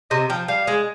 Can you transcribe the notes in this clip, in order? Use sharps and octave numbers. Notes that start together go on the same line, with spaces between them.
C3 D#5
F3 G5
G3 F5
G#3